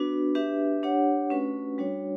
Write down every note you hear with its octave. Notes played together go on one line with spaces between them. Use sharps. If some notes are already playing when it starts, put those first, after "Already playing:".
Already playing: B3 D4 F#4 B4
D4 G4 B4 E5
D4 G4 C#5 F#5
A3 C#4 F#4 B4
G3 D4 F#4 C#5